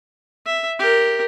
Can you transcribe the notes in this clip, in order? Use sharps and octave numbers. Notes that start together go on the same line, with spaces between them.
E5
G4 A#4